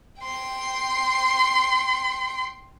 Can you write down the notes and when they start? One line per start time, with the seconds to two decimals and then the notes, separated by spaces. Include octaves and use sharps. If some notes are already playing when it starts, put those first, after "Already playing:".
0.22 G5 C6